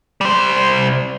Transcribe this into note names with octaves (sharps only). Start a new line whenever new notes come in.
G3 C5